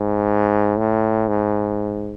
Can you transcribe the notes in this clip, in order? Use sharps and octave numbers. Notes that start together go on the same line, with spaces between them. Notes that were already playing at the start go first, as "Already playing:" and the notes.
Already playing: G#2
A2
G#2